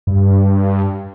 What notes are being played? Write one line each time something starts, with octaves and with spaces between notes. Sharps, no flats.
G2